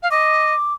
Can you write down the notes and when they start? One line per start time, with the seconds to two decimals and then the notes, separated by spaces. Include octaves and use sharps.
0.03 F5
0.11 D#5 D6